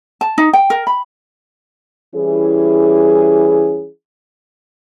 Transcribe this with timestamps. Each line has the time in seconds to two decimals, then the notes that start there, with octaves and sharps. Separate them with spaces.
0.21 A5
0.38 D#4
0.53 G5
0.70 A#4
0.87 B5
2.15 E3 G3 C#4 E4 G#4